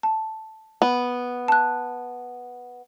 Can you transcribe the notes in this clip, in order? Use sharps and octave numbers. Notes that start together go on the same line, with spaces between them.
A5
B3
A5 F#6